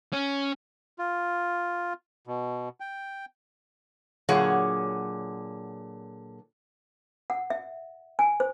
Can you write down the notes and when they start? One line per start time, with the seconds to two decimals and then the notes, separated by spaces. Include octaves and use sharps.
0.13 C#4
0.99 F4
2.27 B2
2.80 G5
4.29 A#2 D3 F#3 G#4 C#5 F#5
7.30 F#5
7.50 E5
8.19 G#5
8.40 C5